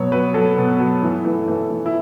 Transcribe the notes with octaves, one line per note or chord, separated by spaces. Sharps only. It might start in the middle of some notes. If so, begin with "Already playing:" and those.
Already playing: B2 F#3 C#5
F#3 B4
F#3 A4
B2
F#3
E3
E3
E3
E3
E4